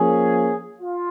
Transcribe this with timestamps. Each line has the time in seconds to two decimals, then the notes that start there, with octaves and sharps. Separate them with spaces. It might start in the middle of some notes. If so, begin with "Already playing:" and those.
Already playing: F3 A#3 C#4 G#4
0.80 F4